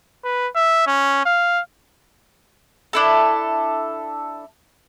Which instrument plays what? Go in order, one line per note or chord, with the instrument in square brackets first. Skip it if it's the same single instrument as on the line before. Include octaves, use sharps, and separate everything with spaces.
[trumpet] B4
E5
C#4
F5
[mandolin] D4 E4 A4